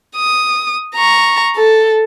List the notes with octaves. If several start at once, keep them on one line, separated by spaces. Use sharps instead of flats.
D#6
A#5 C#6
A4